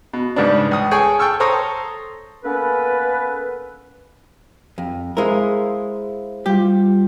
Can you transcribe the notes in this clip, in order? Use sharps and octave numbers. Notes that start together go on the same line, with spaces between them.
B2
G#2 C#3 G3 B3 D4
C#2 D#6
G#4 A4 C#5 G5 G#5
G5 A5 C#6 E6 F6
A4 C5 C#5 A#5 D#6
A#3 B3 C#4 A4 B4
F2
G#3 E4 A#4 C5 F5
G3 F4 G4